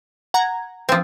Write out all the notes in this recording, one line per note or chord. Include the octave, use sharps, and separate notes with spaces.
F#5 A#5 G#6
F3 C4